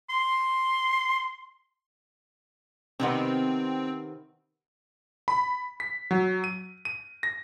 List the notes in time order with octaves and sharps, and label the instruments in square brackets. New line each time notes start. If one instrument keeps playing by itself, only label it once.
[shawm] C6
[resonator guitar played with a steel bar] C3 D#3 B3 [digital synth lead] C4
[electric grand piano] B5
B6
F#3
D#7
D#7
A#6